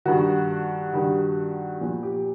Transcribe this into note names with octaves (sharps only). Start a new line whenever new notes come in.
G2 D#3 F#4
G2 D#3
A#2 F3
G4